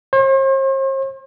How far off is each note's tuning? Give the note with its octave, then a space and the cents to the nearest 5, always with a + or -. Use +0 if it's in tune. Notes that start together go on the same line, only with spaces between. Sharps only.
C5 +45